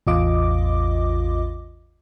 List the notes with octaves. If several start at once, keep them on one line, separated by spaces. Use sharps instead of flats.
A1 E2 F4 D#5 D6